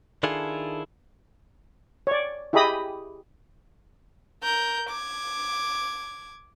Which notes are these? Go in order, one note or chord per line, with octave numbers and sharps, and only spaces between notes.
D#3 D4 E4 F4 G#4 A4
C#5 D5
E4 G4 G#4 D#5 B5 D#6
A#4 G6
D6 G#6